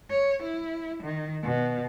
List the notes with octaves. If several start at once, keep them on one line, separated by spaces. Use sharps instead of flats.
C#5
E4
D#3
B2